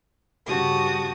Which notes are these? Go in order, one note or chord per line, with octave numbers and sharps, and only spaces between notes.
G2 C#3 F#4 G4 A5 D#6